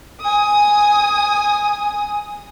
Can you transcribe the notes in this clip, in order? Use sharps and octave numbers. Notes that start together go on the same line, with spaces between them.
G#5 D#6